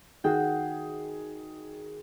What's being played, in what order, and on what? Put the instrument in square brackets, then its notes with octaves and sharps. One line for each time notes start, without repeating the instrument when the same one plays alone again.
[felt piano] D#3 G#4 [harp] F#4 G5